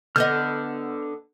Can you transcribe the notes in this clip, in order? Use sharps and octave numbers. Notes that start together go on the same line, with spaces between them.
D3 B3 D#5 F6 G6